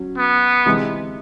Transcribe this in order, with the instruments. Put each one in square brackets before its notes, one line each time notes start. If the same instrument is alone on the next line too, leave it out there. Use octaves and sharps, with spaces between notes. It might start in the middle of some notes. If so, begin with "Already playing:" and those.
Already playing: [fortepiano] F#3 C#4
[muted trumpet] B3
[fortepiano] C3 E3 G#3